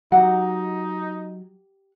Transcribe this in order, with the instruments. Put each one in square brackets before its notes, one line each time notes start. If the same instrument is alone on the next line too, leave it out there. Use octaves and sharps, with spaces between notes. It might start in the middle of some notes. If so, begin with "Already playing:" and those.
[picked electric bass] F#3 [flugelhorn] D#4 [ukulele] G4 F#5